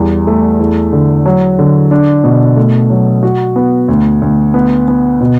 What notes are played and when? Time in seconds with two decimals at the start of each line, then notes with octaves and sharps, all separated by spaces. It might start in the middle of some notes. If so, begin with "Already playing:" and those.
Already playing: E2 G3
0.27 A3
0.60 E2
0.93 D3
1.26 F#3
1.59 D3
1.91 D4
2.24 B2
2.56 A3
2.90 F#3
3.23 F#4
3.56 B3
3.88 D2
4.22 D2
4.54 B3
4.88 B3
5.21 B2